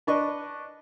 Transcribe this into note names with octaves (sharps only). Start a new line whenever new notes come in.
D4 B4 D5 D#5 C#6